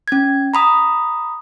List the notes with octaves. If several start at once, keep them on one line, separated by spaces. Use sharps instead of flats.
C#4 G#6
A#5 B5 D#6